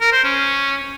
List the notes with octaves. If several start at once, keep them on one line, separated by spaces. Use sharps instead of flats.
A#4
C5
C#4